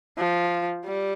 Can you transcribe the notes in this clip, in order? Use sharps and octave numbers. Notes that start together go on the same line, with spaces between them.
F3
G3